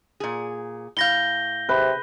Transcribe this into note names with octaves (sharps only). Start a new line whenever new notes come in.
A#2 G#4
A2 F5 G6 A#6 G7
C3 B4